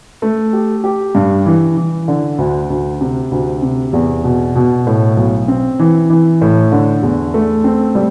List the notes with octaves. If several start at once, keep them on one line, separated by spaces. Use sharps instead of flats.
A3
G4
G4
G2
E3
E3
D3
D2
D2
C3
D2
C3
E2
B2
B2
A2
B1
C4
E3
E3
A2
D3
E2
A3
C4
G3